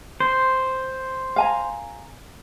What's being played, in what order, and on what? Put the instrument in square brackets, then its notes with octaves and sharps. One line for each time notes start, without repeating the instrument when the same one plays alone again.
[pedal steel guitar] C5
[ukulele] F5 G#5 A#5